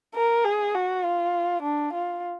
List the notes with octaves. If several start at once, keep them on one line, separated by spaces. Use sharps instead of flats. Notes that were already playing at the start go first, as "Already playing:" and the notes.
A#4
G#4
F#4
F4
D4
F4